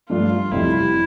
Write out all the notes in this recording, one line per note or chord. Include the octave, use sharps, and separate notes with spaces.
G2 F3 A3 D4 F4
F1 F2 C3 G3 E4